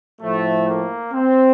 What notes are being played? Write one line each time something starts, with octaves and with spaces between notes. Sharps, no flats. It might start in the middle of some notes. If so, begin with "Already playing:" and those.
A2 F3 A3
A#3
C4